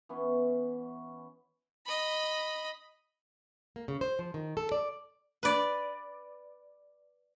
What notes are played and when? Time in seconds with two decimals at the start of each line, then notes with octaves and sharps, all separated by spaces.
0.09 E3 B3 C#4
1.86 D#5 B5
3.76 A#3
3.88 C#3
4.01 C5
4.19 F3
4.34 D#3
4.57 A4
4.72 D5
5.43 B4 D5